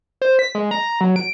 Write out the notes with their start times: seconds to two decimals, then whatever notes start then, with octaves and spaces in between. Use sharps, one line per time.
0.22 C5
0.39 B6
0.55 G#3
0.71 A#5
1.01 F#3
1.16 D7